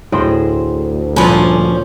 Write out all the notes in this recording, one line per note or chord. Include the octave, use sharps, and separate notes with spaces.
D2 A2 G#4 C5 D#5 G5
G2 A#2 F3 C#4 D4 B4 G#5